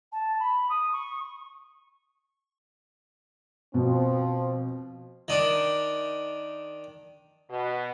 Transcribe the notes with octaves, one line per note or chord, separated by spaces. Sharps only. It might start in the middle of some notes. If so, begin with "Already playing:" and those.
A5
B5
D#6
C#6
B2 F3 C4
D#3 D4
B2